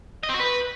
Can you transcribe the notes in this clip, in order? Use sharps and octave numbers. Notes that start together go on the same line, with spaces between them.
D#5
C4
F#4
B4